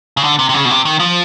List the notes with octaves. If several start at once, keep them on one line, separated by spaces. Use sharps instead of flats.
C#3
D3
C3
C3
C#3
B2
C3
D#3
F3